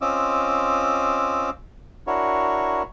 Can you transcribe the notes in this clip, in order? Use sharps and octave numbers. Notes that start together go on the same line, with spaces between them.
C4 C#4 F4 D#5 D6 E6
D4 E4 F#4 A#4 C#5